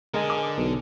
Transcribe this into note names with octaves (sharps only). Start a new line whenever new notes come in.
D3 G#3 A#4 D#5 G#5
G#4 D6
B1